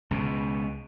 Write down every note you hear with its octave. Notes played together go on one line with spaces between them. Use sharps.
C#2 B2